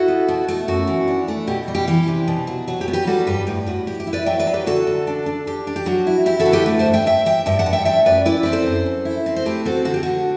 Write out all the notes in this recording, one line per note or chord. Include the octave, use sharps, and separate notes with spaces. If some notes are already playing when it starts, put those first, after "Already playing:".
Already playing: E4 F#4 A4
B3
B2
A3
F#2 F#4
E3
D4
A3
B2 G4
G3
G4
E3 G4
C3
B2
F#3
F#3 F#4
G4
B3
G4 B4
G3 F#4 A4
G2 G4 B4
A2 G4
A2 F#4
E4 G4
G4
E4
B4 D5
F#3 E5 G5
B4 D5
F#3
G4 B4
D3 F#4 A4
D3
D4
D4
D4 G4
D4
G4
F#3 F#4
E4
E4 G4
F#4 A4
D3
G4 B4
A3
C5 E5
G2
E5 G5
G2 E5 G5
G2 E5 G5
G2 E5 G5
F#5 A5
G2
E5 G5
A3 E5 G5
F#2 B4 D5
E4 B4 D5
C4 B4
A4 C5
F#2
F#2
E4
C4
C5
A3 G4 B4
C4 F#4 A4
D3 F#4
G4
D3 F#4